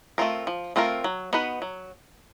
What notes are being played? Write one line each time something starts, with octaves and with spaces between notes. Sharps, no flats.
A3 C4 F4 A#4
F3
A3 C4 F4 A#4
F#3
B3 D#4 F#4 B4
F#3